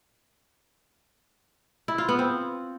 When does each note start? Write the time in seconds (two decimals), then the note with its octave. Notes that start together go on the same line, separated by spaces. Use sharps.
1.88 E4
1.98 F4
2.09 B3
2.19 C4